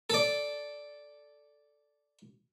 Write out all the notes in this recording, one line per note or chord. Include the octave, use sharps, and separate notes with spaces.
A4 D5